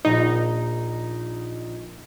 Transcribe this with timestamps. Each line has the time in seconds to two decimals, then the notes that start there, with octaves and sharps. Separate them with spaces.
0.05 A#1 D#4